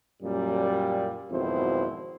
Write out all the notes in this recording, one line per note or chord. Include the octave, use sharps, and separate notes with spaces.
F#2 A#2 G3
G#1 F2 B2 F#3 E4 C5